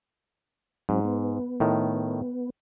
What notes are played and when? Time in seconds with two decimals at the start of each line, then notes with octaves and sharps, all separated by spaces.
0.89 G#2 F#3 C4
1.05 B3
1.60 A2 D#3